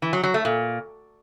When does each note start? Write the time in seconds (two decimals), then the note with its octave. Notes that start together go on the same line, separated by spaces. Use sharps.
0.02 E3
0.13 F#3
0.24 F#3
0.34 A3
0.45 A#2